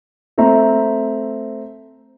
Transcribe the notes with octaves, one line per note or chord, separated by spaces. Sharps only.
A3 C4 E5 A#5